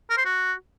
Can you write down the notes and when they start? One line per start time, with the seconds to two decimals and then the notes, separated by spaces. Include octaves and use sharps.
0.10 A#4
0.18 C5
0.25 F#4